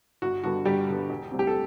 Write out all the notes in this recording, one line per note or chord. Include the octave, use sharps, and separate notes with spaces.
G1 F#4
G2 D3 G3 B3 F#4
G1 G3 G4
G2 D3 G3 B3
E1
D2 C3 G3 C4
G4
A4